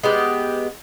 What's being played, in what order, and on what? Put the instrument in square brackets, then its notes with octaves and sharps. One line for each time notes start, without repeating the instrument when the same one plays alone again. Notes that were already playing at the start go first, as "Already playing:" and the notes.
[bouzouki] G#3 B3 G4